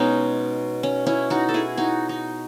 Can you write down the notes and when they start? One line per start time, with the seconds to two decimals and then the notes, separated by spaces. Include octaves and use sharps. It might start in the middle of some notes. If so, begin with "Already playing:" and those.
Already playing: B2 G#3 C#4 D#4
0.83 C#4
1.06 C#4 E4
1.30 D#4 F#4
1.49 A4
1.54 E4 G#4
1.77 D#4 F#4
2.09 D#4